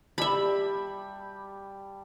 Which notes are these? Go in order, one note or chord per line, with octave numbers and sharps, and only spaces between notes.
G3 G4 E5 A5 B5